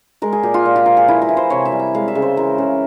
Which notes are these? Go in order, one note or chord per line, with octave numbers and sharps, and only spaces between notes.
G#3 A#4
G#4
A#2 G4
F4
A#2
F4
F3 A#4
G#4
E3 E4
A#4
E3
C5
C3 C#5
E5
G3
E5
G#3 F5
E5
C#3
C5
E3 A#4
C#3